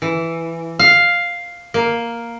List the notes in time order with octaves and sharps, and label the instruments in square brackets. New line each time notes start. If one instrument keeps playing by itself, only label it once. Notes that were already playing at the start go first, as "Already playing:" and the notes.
[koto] E3
F5
A#3